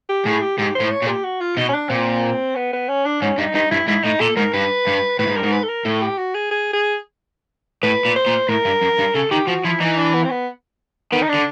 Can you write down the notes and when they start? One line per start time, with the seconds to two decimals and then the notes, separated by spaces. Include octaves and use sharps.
0.09 G4
0.25 A2 G#4
0.42 G4
0.58 G#2 G4
0.75 C5
0.80 A2
0.91 C#5
1.02 A#2
1.08 G4
1.24 F#4
1.41 F4
1.57 B2 D#4
1.69 C#4
1.74 D4
1.90 A#2 C4
2.56 B3
2.73 B3
2.89 C#4
3.05 D4
3.22 G#2 C#4
3.38 G2 D#4
3.54 G2 D#4
3.71 G2 E4
3.87 G#2 E4
4.04 A2 D#4
4.20 A#2 A4
4.37 G#2 A#4
4.53 G2 B4
4.87 G2
5.19 A2 B4
5.27 G#2
5.36 G2 A#4
5.44 G#2
5.52 B4
5.63 A4
5.69 A#4
5.85 A2 A4
6.02 G4
6.18 F#4
6.34 G#4
6.51 G#4
6.73 G#4
7.83 A2 B4
8.05 A#2
8.16 C5
8.27 A#2
8.49 A2 A#4
8.65 G2
8.81 F#2
8.98 G2
9.14 C#3 A4
9.31 D#3 G4
9.47 F3 F#4
9.64 F3 E4
9.80 E3 D#4
9.97 D4
10.14 B3
10.24 C4
10.30 B3
11.12 D#3 B3
11.22 D#4
11.29 D4
11.34 D3